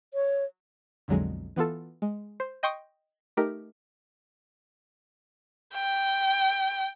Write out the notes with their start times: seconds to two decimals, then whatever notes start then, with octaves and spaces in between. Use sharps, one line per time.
0.14 C#5
1.08 B1 F2 D3 F#3 G#3
1.56 E3 B3 F4 A4
2.02 G#3
2.40 C5
2.63 D#5 G5 C6 C#6 D#6
3.37 A3 D#4 G4 A#4
5.74 G5